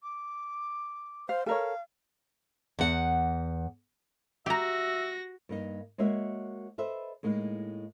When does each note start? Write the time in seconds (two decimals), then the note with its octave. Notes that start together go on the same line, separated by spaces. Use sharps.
0.02 D6
1.29 C5 F5
1.46 A4 A#4 C#5 F5
2.79 E2 F#5
4.46 F#4 G4 E5 A#5 A#6
5.49 G2 A#3 D#4
5.98 G#3 A#3 F#4 C#5 E5
6.78 A4 B4 C5 D#5 E5
7.23 A2 G#3 A#3 D#4